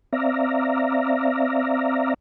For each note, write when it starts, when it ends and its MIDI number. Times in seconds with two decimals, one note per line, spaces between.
0.13 2.14 60
0.13 2.14 74
0.13 2.14 76
0.13 2.14 77
0.13 2.14 82